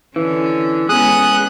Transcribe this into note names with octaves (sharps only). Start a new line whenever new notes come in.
D3 E3 C#4
G#3 B3 C#4 G#4 D#6 F#6